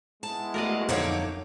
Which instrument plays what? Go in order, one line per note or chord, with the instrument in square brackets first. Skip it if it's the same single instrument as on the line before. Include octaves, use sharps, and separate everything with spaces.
[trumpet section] G#3 B3 E4 [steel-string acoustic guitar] A5
[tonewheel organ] A3 F#4 F5 [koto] A#4 D5 D#5
[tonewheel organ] F2 D#4 D6 [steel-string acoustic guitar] D3 A#3 C#5 [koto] F#3